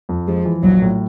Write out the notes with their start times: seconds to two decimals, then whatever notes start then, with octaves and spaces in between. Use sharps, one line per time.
0.09 F2
0.27 F3 G#3
0.45 E3
0.63 A#1 F#3
0.82 A2